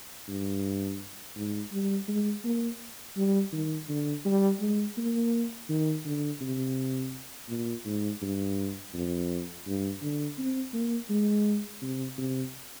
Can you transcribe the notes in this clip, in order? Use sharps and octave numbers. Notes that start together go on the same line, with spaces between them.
G2
G#2
G3
G#3
A#3
G3
D#3
D3
G3
G#3
A#3
D#3
D3
C3
A#2
G#2
G2
F2
G2
D3
C4
A#3
G#3
C3
C3